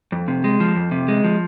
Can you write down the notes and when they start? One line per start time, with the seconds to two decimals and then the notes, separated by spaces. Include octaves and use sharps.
0.12 F2
0.28 C3
0.44 G#3
0.60 F3
0.76 F2
0.91 C3
1.08 G#3
1.24 F3